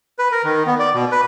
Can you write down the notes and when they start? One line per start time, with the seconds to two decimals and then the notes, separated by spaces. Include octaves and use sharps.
0.19 B4
0.32 A#4
0.44 D#3
0.66 B3
0.79 D5
0.94 B2
1.12 B4